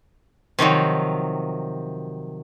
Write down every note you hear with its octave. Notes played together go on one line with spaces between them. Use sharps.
C3 D#3 F3 F#3